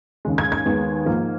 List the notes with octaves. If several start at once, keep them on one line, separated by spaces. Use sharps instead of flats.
D#2 C#3 G#3
G#6
G#6
D#2 D#3 G#3 B3
G#2 F3 A#3